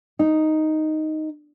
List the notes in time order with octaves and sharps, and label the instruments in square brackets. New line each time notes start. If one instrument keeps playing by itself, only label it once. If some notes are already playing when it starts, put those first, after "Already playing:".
[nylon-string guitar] D#4